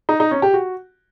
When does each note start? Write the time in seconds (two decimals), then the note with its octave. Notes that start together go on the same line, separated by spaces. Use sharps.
0.09 D#4
0.20 D#4
0.31 C#4
0.42 G4
0.54 F#4